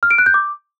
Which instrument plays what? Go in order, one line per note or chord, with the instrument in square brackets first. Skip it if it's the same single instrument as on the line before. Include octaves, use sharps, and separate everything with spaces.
[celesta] F6
D7
F#6
G6
D6